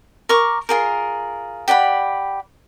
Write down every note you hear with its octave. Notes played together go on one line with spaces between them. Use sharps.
A#4 C#6 D6
F4 G#4 A#4
G4 D5 F#5 B5